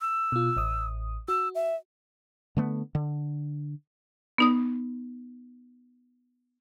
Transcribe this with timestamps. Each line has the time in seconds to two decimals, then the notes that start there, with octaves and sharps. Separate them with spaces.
0.01 E6
0.32 B2 F4
0.56 A1 D#6
1.28 F#4 E6
1.55 E5
2.57 D3 A3 B3
2.95 D3
4.38 B3 D#4 D#6